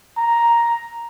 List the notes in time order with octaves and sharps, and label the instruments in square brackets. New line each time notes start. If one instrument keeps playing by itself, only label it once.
[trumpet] A#5